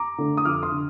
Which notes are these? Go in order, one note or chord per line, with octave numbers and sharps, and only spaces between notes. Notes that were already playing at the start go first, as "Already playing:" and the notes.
Already playing: A#5 D6
D3 A3
D#6
F2 D6 F6
C6 D#6
D3